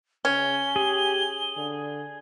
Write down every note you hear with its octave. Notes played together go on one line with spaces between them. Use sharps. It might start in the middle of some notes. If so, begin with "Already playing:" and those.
C#3 C#4 G7
G4 G#4
D3